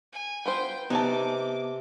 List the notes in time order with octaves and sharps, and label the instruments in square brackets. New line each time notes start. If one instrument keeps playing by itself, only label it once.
[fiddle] G#5
[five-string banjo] B3 F4 C5 [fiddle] G5
[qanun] C3 C4 [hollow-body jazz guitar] B3 [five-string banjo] D#4 G#5 A5 [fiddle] D6